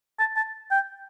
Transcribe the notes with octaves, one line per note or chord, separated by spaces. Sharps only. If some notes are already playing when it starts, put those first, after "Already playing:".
A5
A5
G5